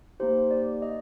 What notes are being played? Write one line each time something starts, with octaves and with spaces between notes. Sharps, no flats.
A#3 D#4 G4 C5
D5
D#5